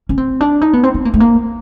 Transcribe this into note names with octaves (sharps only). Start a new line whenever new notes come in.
C#4
C4
D4
D#4
B3
C4
C4
A#3
A3
A#3